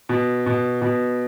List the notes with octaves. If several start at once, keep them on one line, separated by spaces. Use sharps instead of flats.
B2
B2
B2